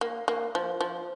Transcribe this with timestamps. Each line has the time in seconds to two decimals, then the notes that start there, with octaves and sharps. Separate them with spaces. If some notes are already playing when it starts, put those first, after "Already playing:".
0.01 A#3
0.28 A#3
0.55 F3
0.81 F3